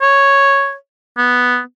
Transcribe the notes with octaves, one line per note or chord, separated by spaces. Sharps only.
C#5
B3